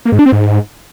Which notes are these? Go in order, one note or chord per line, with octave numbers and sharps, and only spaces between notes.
A#3
G#2
D4
C4
G#2